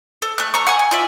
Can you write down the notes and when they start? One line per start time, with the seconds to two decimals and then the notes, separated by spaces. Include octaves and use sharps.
0.22 A4
0.38 A3 F#6
0.54 A4 A#5 C#6
0.67 F#5 G#5 C#6
0.79 G#5
0.91 F4 D5 E5